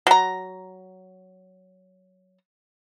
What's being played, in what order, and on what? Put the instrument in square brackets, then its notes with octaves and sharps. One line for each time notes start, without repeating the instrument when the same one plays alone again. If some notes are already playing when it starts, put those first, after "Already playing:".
[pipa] F#3 A#5